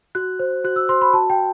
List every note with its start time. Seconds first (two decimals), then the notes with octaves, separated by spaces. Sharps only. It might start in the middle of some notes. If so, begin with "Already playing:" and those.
0.15 F#4 F#6
0.39 C5
0.64 F#4 F#6
0.76 E6
0.89 C5 C6
1.01 B5
1.13 F#4 A5
1.30 G5